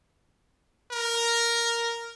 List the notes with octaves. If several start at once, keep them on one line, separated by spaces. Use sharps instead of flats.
A#4